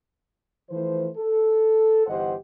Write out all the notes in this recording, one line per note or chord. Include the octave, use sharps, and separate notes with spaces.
E3 F3 A3 B4 C5
A4
G1 E3 G4 C5 D#5 F#5